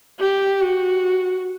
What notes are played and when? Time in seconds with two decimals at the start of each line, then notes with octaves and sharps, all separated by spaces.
0.20 G4
0.61 F#4